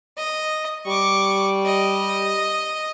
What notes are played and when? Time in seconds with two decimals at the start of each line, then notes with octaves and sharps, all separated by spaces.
0.17 D#5
0.87 G3 C#6 D6
1.66 D#5